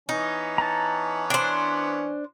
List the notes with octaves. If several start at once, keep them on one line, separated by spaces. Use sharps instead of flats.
E3 B3 C#4 D#4
A5 A#5
D4 C5